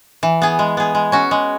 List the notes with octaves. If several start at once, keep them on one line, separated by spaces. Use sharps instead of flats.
E3
B3 G#4
G#3
B3 G#4
G#3
C#4 F#4
G#3